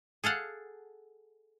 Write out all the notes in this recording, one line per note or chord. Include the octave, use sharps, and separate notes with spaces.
G#4 A4 F5 F#5